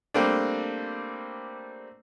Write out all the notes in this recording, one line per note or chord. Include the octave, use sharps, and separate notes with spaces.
G3 A3 A#3 C4 D4